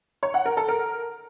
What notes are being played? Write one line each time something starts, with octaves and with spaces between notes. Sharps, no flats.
C#5
F#5
A#4
A4
A#4